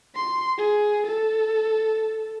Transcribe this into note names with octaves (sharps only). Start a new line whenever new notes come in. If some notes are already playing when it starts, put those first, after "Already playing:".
C6
G#4
A4